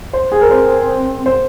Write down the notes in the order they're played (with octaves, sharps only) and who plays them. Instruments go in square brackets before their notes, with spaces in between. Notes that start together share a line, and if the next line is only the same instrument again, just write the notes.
[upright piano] C5
G#4
A#4
[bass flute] C4 [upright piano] C5
[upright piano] C5